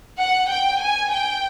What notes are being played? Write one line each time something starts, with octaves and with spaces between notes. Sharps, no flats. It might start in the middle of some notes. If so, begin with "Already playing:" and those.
F#5
G5
G#5
G5